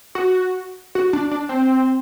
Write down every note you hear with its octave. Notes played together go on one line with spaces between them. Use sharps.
F#4
F#4
D4
D4
C4